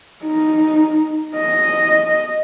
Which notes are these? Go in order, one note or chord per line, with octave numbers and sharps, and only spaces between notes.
D#4
D#5